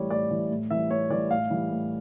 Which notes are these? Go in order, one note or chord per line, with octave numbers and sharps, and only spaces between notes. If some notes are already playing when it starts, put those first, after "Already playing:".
Already playing: A2 E3 G3 C#5
A2 D5
E3 G3
A2
E3 G3 E5
A2 C#5
E3 G3 D5
A2 F5
E3 G3
A2